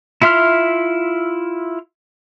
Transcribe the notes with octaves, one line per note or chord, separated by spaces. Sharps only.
E4 F4 E5 C6 F6